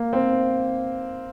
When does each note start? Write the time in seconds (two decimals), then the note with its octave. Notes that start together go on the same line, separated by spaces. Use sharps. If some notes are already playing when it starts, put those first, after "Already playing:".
Already playing: A#3
0.13 C4